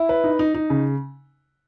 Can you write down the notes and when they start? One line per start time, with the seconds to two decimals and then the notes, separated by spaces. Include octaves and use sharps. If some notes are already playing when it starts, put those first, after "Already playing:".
Already playing: E4
0.09 B4
0.24 D#4
0.39 D#4
0.55 D#4
0.70 C#3